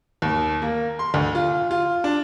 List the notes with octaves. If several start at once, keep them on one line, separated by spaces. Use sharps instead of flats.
D#2
A#3
C6
D2
F4
F4
D4